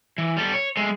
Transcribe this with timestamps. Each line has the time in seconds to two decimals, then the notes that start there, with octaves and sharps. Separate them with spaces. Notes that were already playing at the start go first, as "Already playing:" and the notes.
0.18 E3
0.37 G3 A4
0.54 C#5
0.77 G#3 A3